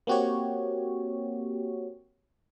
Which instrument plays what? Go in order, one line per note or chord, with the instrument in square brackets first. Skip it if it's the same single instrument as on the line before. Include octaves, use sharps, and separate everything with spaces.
[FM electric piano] A#3 C4 F#4 G4 C#5